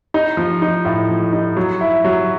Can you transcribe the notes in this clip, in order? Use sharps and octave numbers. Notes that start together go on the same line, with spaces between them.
D#4
F3
D#4
A2
F3
D#4
F#3
E4
F#3